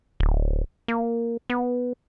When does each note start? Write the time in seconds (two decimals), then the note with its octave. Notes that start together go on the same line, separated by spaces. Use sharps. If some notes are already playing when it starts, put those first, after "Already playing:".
0.20 D1
0.88 A#3
1.50 B3